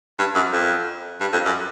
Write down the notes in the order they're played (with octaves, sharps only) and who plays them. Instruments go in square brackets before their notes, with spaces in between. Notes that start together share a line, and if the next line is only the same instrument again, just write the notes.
[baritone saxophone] G2
F#2
F2
G2
F2
F#2